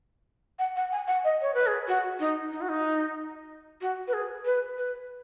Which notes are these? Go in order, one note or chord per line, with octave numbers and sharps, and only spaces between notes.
F#5
F#5
G#5
F#5
D#5
C#5
B4
G#4
F#4
D#4
D#4
F#4
D#4
F#4
B4
G#4
B4
B4